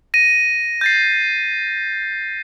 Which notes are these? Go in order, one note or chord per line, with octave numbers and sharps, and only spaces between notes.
A#6 D#7
G6 A6 C7